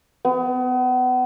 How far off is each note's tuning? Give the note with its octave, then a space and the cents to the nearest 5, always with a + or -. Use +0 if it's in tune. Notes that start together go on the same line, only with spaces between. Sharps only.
B3 +35